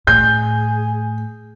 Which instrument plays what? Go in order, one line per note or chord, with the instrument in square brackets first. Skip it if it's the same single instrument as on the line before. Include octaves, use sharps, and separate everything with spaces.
[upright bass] A2 [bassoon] G#4 [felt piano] G6